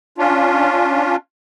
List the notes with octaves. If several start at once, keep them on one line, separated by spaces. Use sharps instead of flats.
C#4 D4 F4